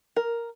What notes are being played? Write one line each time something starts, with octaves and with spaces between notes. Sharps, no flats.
A#4